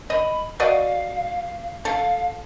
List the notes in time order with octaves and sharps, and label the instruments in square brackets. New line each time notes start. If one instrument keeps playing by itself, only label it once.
[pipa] D#5 [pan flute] B5
[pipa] F#4 D5 D#5 [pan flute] F5
[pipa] A4 [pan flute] F5